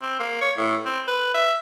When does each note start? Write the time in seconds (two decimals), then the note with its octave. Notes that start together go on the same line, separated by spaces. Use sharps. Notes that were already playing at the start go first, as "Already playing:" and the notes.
0.02 C4
0.20 A#3
0.41 C#5
0.57 A2
0.86 C4
1.08 B4
1.35 E5